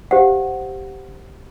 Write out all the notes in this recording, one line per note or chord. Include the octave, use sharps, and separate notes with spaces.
G4 C5 F5 F#5